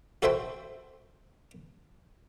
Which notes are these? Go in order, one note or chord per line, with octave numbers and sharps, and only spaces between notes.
F#4 A4 C5 E5 G5 C6